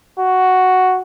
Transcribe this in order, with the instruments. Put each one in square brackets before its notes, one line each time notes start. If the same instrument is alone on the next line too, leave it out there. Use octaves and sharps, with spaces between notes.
[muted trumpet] F#4